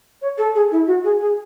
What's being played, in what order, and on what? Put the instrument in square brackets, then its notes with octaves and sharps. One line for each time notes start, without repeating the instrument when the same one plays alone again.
[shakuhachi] C#5
A4
G#4
E4
F#4
G#4
G#4